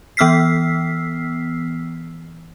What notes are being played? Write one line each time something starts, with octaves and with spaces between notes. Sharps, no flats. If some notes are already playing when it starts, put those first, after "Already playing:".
E3 B3 E6 F6 B6 C7